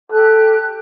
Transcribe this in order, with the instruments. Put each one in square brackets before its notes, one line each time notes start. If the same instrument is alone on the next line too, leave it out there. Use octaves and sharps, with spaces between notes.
[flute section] G4 F#6 [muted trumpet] A4